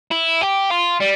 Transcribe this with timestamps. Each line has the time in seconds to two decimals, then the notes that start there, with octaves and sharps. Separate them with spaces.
0.11 E4
0.41 G4
0.70 F4
1.00 G3